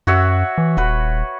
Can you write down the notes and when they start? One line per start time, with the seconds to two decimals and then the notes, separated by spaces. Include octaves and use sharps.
0.07 F#2 F#4 C#5 E5
0.58 E3
0.77 D#1 F#4 B4